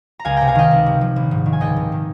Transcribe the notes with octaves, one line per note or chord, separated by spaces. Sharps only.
A#5
C#2 F5 G#5
C3 G5 A#5
F5 G#5
D#3 D#5 G5
C#2
C3
F3
A#1
G#2
D#3
G#5
C#2 D#5 G5
C3
D#3